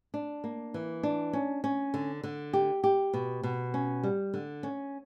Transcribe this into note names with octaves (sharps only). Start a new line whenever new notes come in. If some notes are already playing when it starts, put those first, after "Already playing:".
D4
A#3
E3
D4
C#4
C#4
D3
D3
G4
G4
B2
B2
C#4
G3
D3
C#4